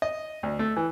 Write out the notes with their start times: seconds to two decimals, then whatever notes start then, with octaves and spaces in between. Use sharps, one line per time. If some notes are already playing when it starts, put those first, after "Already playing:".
0.02 D#5
0.43 D2
0.59 A3
0.77 E3